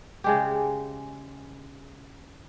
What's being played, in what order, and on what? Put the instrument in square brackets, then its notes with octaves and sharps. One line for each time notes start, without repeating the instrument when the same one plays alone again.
[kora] C#3 G#3 G4